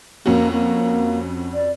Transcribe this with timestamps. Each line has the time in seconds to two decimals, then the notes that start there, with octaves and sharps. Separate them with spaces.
0.26 F2 A#3 C#4 F#4
0.53 A#3
1.54 D5